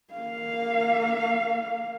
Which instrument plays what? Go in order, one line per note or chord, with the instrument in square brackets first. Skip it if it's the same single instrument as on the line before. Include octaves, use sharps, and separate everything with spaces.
[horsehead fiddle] A#3 F5